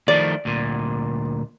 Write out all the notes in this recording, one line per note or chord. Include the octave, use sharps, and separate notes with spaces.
D#3 F3 A3 D5
D2 A#2